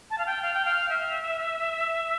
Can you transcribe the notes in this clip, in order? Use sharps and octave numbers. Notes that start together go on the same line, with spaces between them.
A5
F5
G5
F5
G5
F5
E5